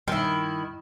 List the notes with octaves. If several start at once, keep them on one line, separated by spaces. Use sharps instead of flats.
G2 D#3 E4